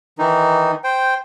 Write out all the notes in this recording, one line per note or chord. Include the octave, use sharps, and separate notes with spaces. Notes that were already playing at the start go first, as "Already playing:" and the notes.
D#3 E3 D#4
C5 G5